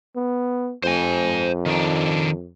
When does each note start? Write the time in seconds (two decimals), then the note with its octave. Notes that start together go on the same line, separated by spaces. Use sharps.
0.16 B3
0.83 F2 C5 G#5
1.66 D#3 D4